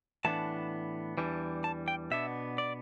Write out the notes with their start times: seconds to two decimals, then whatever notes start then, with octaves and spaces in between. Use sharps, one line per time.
0.25 A2 E3 B3 D4 A5
1.18 E2 E3 G3 D4
1.64 A5
1.88 G5
2.11 B2 B3 D4 E5
2.58 D5